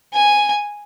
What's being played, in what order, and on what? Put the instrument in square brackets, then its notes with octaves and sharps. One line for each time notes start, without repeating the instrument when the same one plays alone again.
[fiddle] G#5